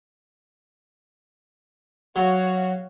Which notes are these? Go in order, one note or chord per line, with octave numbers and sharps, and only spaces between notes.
F#3 F#4 C#5 F5